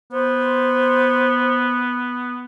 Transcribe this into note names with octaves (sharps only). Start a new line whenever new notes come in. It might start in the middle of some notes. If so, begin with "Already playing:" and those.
B3 C5